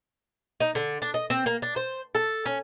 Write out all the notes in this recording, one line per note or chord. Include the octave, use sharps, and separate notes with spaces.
D#4
D3
D4
D#5
C4
A#3
D4
C5
A4
C#4